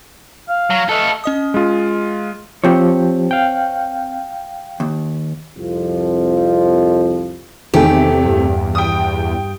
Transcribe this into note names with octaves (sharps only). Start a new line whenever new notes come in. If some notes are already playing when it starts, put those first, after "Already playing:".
F5
F#3
A3 A4 B4 D#5 F5
C#4 D#5 D#6
G#3 F4
F3 C4 G4 C#5
F5 G5
D#2
C2 F2 F3
E2 C3 D#3 A3 D#4 G4 G#5
G2
G5 D#6